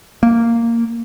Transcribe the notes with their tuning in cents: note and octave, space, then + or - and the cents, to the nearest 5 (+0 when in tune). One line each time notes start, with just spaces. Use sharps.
A#3 -10